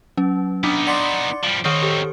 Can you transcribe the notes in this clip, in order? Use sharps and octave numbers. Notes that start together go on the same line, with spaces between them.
F#3 C#4
B3 D4 D#4 D6
D5 F#5 C6 D6 A6 C#7
F3 G3 D7
D#3 C4 D#4 C#5 C#6 D#6 F6 G6
G4 A4 C5